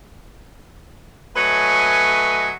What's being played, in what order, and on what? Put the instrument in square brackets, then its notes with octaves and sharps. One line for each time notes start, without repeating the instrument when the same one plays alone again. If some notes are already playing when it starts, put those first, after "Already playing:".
[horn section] F#3 A3 B4 C#5 D#5 G#5